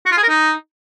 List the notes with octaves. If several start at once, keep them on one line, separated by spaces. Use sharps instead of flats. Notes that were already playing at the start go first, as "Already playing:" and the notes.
F#4
F4
G#4
A#4
D#4